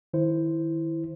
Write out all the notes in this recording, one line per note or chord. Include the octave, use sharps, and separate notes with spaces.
D#3 E4 C5